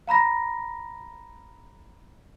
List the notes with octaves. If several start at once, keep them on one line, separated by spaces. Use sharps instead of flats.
F5 A#5 B5 A#6